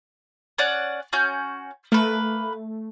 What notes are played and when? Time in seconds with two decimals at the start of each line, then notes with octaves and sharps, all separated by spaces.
0.58 C#4 D5 F#5
1.13 C#4 F#4 G6
1.92 A3 A#3 B4